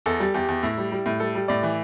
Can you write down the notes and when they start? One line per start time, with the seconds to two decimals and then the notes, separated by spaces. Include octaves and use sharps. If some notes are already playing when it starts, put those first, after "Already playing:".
0.06 E2 A4
0.20 G3
0.34 E2 G4
0.48 E2
0.63 A2 E4
0.77 G3
0.92 G3
1.06 A2
1.20 G3 A4
1.35 G3
1.48 A2 D5
1.63 E3